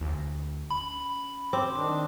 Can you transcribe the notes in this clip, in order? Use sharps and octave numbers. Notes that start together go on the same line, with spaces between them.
D2
C#4 B5
C4 D6
D#3 G3 D4